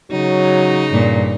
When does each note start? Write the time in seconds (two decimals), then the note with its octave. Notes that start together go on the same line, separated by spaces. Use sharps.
0.12 C#3 F#3 D#4
0.91 G2 A#2